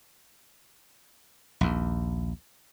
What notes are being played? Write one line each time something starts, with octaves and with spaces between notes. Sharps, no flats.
A#1 D#2